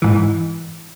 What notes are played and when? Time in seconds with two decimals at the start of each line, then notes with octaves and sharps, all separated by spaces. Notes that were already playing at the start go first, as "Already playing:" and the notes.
0.02 G#2 E3